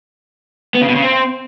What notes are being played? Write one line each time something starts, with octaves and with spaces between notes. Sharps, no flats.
B3
C#3
B2
C#3
C4